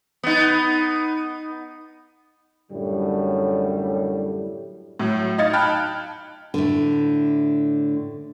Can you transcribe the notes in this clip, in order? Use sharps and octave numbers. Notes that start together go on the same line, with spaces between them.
B3 D#4
F#2 A2 D3 G3
A2 F#3
D#4 D#5 F5 G#6 A6 C#7
G5 A5 B5 F6 F#6
A2 D3